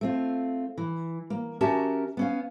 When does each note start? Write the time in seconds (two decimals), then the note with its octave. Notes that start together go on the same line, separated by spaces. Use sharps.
0.01 A3 C4 F4
0.78 E3
1.30 A#3
1.61 C#4 F#4 G4 A#4 E5 A5
2.17 B3 C#4 F5